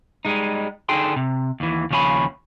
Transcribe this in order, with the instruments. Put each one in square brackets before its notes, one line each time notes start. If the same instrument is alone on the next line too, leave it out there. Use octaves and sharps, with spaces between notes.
[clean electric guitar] G3 G#3 D#4
D3 D#4 G#4 A4 G5 C6
C3
D#2 E3
D#2 C#3 F3 C#5 G#5 B5